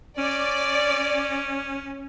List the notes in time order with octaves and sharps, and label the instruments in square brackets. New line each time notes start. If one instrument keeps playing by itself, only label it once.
[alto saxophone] C#4 [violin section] D5